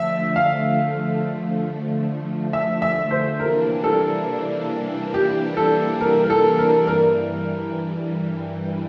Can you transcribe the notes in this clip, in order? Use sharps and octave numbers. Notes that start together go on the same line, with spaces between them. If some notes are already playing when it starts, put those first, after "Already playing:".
Already playing: D3 F3 A3 E5
F5
E5
E5
C5
C3 E3 G3 A#3 D4 A#4
A4
G4
A4
A#4
A#4
A4
A#4
G2 E3 G3 A#4